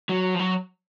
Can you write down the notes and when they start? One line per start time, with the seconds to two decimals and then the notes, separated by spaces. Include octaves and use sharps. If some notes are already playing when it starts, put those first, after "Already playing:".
0.09 F#3
0.35 F3
0.39 F#3